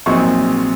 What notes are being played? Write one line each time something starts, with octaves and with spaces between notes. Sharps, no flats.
A#1 A#2 F#3 C4 D#4 C#6